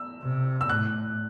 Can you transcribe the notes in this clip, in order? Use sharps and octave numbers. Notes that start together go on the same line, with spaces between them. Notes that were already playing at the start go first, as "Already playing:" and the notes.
Already playing: E6
C3
E6
A2 F#6